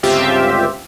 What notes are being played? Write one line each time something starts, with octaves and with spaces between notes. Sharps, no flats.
G1 C#2 C4 F4 G4 E5